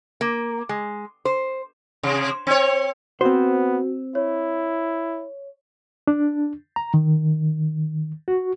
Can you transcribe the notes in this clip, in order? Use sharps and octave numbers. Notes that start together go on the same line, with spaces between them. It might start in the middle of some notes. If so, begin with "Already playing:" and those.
A#3
G#3
C5
C3
C4 C#5
B3 C4 F#4 C5
E4 C#5
D4
A#5
D#3
F#4